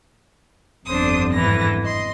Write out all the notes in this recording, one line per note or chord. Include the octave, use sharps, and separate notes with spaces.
G1 F2 D3 D4 C5 D#6
G#2 E3 A#6
D#5 C6